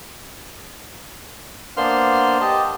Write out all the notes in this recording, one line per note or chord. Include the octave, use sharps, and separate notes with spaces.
A#3 B3 D4 C5 C6 F6
G4 D#5 A5